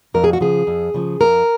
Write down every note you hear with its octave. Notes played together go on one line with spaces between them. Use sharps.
F2 A#4
G#4
F#4
C#3 F3 G#4
F2
C#3 F3
F2 A#4